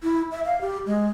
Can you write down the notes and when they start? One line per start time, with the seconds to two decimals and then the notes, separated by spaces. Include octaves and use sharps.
0.03 E4
0.31 E5
0.45 F5
0.61 G4
0.86 G#3